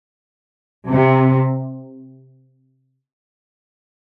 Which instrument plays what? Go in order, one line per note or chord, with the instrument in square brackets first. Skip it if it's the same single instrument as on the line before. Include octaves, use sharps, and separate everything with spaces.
[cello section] C3